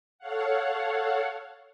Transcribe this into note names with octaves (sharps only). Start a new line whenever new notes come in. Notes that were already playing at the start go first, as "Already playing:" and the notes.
A4 C#5 F5 F#5